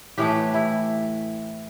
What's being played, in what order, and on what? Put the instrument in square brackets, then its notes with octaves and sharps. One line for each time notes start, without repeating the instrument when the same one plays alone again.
[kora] A2 E3 A3 G4
E4